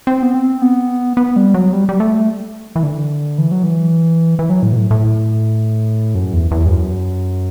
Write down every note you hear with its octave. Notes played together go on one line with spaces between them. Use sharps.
C4
B3
C4
B3
B3
G3
F#3
G3
G3
A3
E3
D3
E3
F#3
E3
E3
F#3
A2
B2
A2
A2
F#2
E2
E2
G2
F#2